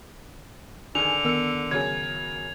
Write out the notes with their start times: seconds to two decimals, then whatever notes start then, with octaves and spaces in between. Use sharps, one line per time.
0.95 D3 D#3 G#4 G#5 F7
1.25 D#3 B3 A#4 E6 C#7
1.71 C#3 F#3 G#4 G#6